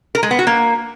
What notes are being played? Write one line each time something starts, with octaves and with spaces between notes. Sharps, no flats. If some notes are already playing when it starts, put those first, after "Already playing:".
A#4
G#3
B3
F#4
A#3